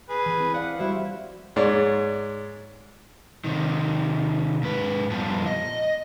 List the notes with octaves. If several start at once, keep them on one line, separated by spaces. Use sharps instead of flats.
G#4 B4
E3
C4
D5 F5 F#5
G3 E4 F#4 C5
G#2 G#3 C#5 D5
C3 D#3
G#2 B4
F2 A#2 G3 B3 F4 A5
D#5